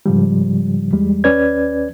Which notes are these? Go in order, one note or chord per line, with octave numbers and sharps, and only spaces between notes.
G#2 C#3 F3 G3
E2 G3 G#3
D#2 C#4 B4 D5 G#6